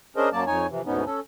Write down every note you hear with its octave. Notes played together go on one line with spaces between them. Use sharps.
C#4 D4 G#4 A#4 C5 D#5
F#2 F#3 A#3 D5 A5
F2 D#4 C#5 G#5
F2 C3 E3
D2 G#2 B2 B3 C#4 D#4
C#4 A4